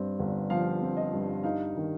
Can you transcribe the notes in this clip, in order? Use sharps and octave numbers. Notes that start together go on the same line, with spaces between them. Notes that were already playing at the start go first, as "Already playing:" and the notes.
Already playing: G2 C4
G1
F3 F5
C4
D#5
G2
D#4 F5
D#3